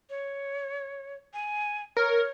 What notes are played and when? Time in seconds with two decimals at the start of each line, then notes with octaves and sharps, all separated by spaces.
0.10 C#5
1.34 G#5
1.97 A#4 C#5